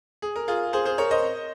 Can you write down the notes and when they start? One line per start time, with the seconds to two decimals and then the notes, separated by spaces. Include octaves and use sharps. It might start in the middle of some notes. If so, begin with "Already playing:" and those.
0.22 G#4
0.36 A#4
0.48 F4 G#4
0.73 G#4 C5
0.85 G#4 C5
0.98 A#4 C#5
1.11 C5 D#5